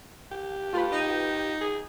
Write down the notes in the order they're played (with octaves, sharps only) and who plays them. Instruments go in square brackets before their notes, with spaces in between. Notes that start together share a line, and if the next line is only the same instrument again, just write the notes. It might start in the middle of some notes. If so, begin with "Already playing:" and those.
[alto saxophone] G4
[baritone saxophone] A3 [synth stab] F4 B4
[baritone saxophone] D#4
[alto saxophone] G#4